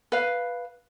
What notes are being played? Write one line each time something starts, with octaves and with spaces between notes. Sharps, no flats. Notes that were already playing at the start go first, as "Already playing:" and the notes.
B4 F5